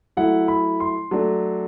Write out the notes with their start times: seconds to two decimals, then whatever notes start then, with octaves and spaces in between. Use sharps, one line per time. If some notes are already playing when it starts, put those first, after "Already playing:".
0.17 F#3 A3 E4 F#5
0.48 B5
0.80 C6
1.11 F#3 A3 D4